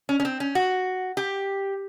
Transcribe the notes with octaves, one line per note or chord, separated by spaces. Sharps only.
C#4
C#4
C4
C#4
F#4
G4